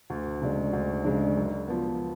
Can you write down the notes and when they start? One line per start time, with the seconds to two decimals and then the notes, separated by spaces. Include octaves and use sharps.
0.10 D2
0.41 C#3 G#3 D4
0.73 D2
1.04 C#3 G#3 D4
1.36 F#2
1.68 F3 B3